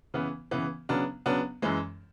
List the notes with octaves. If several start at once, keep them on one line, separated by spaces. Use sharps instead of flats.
C#3 E3 B3
C#3 E3 B3
C#3 F#3 B3 D4
C#3 F#3 B3 D4
F#2 E3 G#3